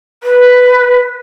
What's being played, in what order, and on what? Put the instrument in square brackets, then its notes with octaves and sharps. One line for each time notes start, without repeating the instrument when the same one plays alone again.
[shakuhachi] B4